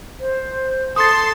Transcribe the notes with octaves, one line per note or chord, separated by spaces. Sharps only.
C5
A4 C6 D#6 A6